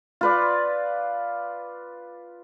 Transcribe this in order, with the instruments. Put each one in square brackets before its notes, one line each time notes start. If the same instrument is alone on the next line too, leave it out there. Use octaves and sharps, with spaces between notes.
[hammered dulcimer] F4 B4 D5